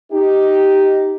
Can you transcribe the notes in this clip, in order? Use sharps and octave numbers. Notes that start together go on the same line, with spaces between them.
D#4 G4